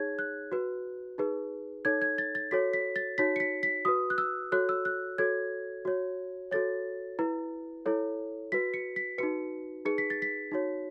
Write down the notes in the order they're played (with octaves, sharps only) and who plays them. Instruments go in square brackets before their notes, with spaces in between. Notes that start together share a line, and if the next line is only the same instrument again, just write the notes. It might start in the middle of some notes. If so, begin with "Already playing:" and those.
Already playing: [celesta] D#4 G#4 C#5 G#6
F#6
F#4 B4
D#4 G#4 B4
D#4 A4 C#5 G#6
G#6
A6
A6
F#4 A4 C#5 B6
B6
A6
D#4 F#4 C#5 B6
C#7
B6
B6
F#4 B4 D#6
F#6
E6
F#4 A4 C#5 F#6
E6
F#6
F#4 A4 C#5 G#6
F#4 C#5
F#4 A4 C#5 A6
E4 B4
E4 A4 C#5
F#4 B4 B6
C#7
B6
D#4 F#4 B4 C#7
D#4 G#4 B4 C#7
B6
A6
B6
D#4 F#4 C#5